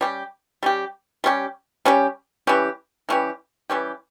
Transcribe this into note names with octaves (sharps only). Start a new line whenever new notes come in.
G3 C#4 G4
G3 C#4 G4
G3 C#4 G4
G3 C#4 G4
E3 G3 C#4 G4
E3 G3 C#4 G4
E3 G3 C#4 G4